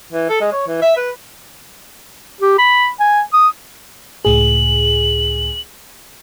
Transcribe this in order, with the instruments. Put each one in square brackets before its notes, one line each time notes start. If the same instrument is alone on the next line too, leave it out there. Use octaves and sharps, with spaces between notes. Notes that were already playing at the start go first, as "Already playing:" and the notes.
[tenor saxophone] E3
A4
G#3
C#5
E3
E5
B4
[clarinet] G4
B5
G#5
D#6
[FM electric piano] C#2 A2 G#4 [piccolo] F#7